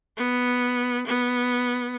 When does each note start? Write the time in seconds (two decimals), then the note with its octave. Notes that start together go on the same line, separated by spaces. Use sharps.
0.17 B3
1.06 B3